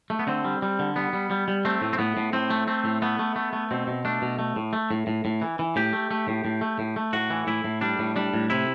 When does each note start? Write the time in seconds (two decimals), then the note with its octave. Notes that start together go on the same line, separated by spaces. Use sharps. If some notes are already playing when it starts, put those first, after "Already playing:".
0.10 A3
0.19 B3
0.27 D3 C4
0.44 G3
0.62 G3
0.79 D3
0.96 G3 B3
1.13 G3
1.31 G3
1.48 G3
1.65 A3 C4
1.82 A2
1.93 C4
1.98 A2 B3
2.17 A2
2.33 A2 C4
2.50 A3
2.67 A3 C4
2.85 A2
3.02 A3 B3
3.19 A3
3.36 A3
3.53 A3
3.71 B2 C4
3.87 B2
4.05 A3 D4
4.22 B2
4.39 A3
4.56 A2
4.73 A3
4.91 A2
5.07 A2
5.25 A2
5.42 E3
5.59 E3
5.76 A2 G4
5.93 A3
6.11 A3
6.28 A2
6.45 A2
6.61 A3
6.79 A2
6.96 A3
7.13 A2 F#4
7.30 E3
7.47 A2 E4
7.64 A2
7.81 G3 D4
7.99 A2
8.16 G3 D4
8.34 A2
8.50 C3 E4